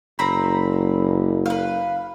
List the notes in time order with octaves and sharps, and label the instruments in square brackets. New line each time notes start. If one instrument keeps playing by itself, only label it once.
[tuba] F#1 [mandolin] C4 A#5 B5
[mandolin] B4 F5